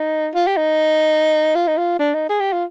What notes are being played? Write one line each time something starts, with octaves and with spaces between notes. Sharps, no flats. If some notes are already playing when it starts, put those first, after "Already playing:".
Already playing: D#4
F4
G4
D#4
F4
D#4
F4
D4
D#4
G#4
G4
F4